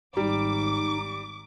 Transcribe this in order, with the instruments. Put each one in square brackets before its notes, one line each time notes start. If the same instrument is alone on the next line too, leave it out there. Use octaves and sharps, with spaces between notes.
[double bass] G#1 [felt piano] G3 [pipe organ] D#4 [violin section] D6